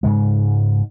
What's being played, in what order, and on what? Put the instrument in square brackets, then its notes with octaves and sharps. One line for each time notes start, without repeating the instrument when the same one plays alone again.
[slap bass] G#2 C#3 G#3